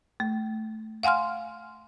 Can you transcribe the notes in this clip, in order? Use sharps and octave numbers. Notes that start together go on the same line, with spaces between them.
A3
F5 F#5 G#5 C6 F6